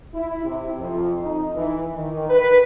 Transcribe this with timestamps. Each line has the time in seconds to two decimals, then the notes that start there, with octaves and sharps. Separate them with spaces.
0.14 E4
0.45 C3
0.79 F2
1.21 D#4
1.55 E3
1.93 D#3
2.29 B4